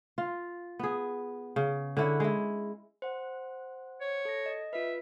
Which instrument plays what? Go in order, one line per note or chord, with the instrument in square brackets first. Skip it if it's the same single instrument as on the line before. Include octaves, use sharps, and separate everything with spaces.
[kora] F4
B3 G#4
C#3
D3 C#4 E4 F#5
G#3 E4
[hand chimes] C5 F#5
[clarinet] C#5
[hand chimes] A4 A#6
D#5
[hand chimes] F4 B4 [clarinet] E5